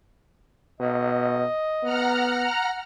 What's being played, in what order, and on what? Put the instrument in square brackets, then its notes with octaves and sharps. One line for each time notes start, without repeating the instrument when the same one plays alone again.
[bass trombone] B2 [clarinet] D#5
[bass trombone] B3 [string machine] F#5 A#5 F6